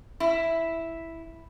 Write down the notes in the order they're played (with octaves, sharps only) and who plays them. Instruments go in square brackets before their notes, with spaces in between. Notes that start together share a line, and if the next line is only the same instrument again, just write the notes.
[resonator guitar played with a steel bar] E4